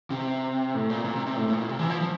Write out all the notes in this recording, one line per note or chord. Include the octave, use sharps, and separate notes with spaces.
C3
A2
A#2
A#2
C3
C3
A2
A2
A#2
C3
E3
F3
F3